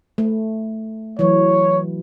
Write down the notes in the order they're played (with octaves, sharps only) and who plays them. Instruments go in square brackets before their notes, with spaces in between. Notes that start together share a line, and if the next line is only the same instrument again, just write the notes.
[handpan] A3
[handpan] E3 F#3 [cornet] C#5